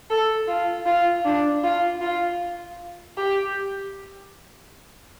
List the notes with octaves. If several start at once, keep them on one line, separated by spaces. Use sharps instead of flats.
A4
F4
F4
D4
F4
F4
G4